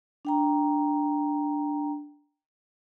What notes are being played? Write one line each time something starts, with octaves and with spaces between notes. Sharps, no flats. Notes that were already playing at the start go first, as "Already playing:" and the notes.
D4 G5 A#5